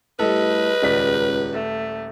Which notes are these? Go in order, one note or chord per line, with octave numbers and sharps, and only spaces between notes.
A2 G3 A4 B4 D#5
D#1 C#2 D5 B6
A3